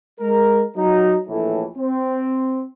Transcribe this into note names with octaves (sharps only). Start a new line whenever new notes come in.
G#3 A#4
F#3 D#4
A#1 A2 E3
C4